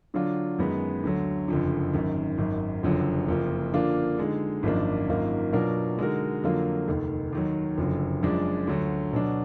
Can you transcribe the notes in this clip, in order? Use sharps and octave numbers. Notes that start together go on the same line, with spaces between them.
D3 F#3 D4 F4
F#2 D#3 G#3 B3
D2 D3 F#3
F#1 F2 D3
G#1 F#2 D#3
G#1 F#2 D#3
F#1 F2 D3 F#3
F#1 F2 F3 A#3
D3 F3 A#3 D4 F4
D3 G#3 D#4
G#1 F#2 F3 A#3 D4
G#1 F#2 D#3 A#3 F4
B2 F#3 D4 F4 A#4
D3 G#3 D#4 F#4 A#4
F2 D3 F#3 A#3 F4
F1 D#2 D#3
D#2 D#3 F#3
F#1 F2 D3 F#3
F#2 F3 G#3 D4
D2 D3 F#3
B2 F#3 D4